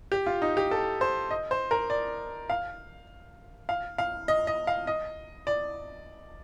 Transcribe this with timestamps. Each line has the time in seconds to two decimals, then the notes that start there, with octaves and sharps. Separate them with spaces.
0.12 G4
0.26 F4
0.42 D#4
0.57 G4
0.71 A4
1.01 C5
1.31 D#5
1.51 C5
1.71 A#4
1.90 D5
2.50 F5
3.69 F5
3.98 F5
4.28 D#5
4.47 D#5
4.67 F5
4.87 D#5
5.47 D5